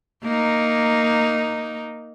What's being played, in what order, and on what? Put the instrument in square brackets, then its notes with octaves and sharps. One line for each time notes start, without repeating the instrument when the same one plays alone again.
[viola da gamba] A#3 D#4